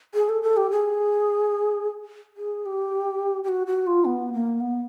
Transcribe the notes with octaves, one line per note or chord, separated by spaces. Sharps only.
G#4
A4
A4
G4
G#4
G#4
G4
G4
F#4
F#4
F4
B3
A#3
B3